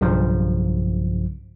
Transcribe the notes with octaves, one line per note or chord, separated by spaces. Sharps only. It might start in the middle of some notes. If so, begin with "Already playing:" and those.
B1 G2 C#3 F3